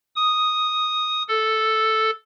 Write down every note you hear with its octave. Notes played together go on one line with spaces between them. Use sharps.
D#6
A4